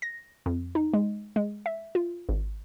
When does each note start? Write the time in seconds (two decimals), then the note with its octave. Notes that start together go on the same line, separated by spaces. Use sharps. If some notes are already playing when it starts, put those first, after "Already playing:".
0.02 A#6
0.46 F2
0.75 D#4
0.94 G#3
1.36 G#3
1.66 E5
1.95 F4
2.29 G#1